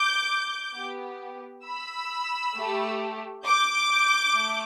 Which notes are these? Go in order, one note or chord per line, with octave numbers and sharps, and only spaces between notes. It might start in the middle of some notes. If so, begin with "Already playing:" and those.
Already playing: D6 G6
B3 G4
B5 E6
A3 G4
D6 G6
A3